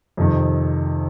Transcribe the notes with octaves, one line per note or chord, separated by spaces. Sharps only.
F2 C3 D#3